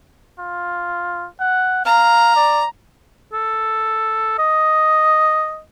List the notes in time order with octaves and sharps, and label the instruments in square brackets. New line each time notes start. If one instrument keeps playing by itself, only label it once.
[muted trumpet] F4
F#5
[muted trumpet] F5 [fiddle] A#5
[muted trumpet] D5
[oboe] A4
D#5